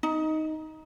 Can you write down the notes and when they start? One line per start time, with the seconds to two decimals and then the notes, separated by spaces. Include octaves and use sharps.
0.03 D#4